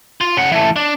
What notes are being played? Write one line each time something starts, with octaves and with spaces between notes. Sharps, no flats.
F4
C#3 F#5
E3 A3
D4